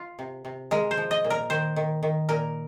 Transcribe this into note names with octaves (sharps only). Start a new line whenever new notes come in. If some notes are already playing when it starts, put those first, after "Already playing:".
Already playing: F4
C3
C3
G#3 A#4
C5
F3
D#5
A#2
A#4
D#3 C5
D#3
D#3
A#2 A#4